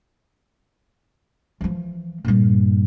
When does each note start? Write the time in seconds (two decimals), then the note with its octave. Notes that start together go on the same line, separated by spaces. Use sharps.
1.61 E3 F3
2.25 G2 A#2